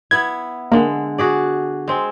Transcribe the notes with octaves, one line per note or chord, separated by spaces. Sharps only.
B3 E4 G#6
D3 G#3 A#3
F#4 G#4 D5
G#3 C4